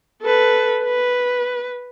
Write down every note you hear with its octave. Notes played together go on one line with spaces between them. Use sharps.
A4 B4
B4